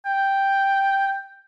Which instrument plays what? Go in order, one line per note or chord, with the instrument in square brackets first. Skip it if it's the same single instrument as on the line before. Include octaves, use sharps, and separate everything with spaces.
[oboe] G5